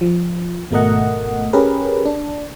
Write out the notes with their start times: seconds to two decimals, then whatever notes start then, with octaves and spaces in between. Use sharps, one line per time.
0.01 F3
0.71 G#1 B2 A3 A#4 D#5 F#5
1.53 C#4 G4 G#4 A#4 B4
2.05 D4